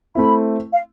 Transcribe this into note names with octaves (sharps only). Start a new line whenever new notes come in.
A3 C4 E4 B5
F5